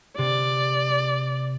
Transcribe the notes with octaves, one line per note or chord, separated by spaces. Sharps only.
C3 D5